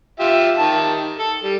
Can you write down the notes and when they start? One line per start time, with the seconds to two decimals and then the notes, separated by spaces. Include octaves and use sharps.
0.20 F4 G4 E5
0.58 D#3 G4 A5
1.19 A4
1.43 G3